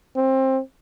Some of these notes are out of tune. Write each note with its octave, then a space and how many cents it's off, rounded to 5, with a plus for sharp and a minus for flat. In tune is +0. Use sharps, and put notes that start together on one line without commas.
C4 +20